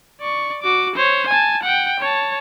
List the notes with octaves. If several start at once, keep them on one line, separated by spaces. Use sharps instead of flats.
D5 C#6
F#4 D6
C5 C#5
G#5 A5
F#5 G5
C#5 A5